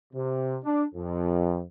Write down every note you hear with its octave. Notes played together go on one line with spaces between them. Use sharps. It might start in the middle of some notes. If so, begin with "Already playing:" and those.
C3
D4
F2